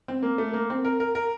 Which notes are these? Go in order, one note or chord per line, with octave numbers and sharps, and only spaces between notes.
C4
A#3
A3
A#3
C4
A#4
A#4
A#4